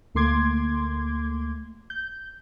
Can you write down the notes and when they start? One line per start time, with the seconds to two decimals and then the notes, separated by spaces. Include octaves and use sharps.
0.15 D2 A3 A#3 C6 D6 G#6
1.90 G6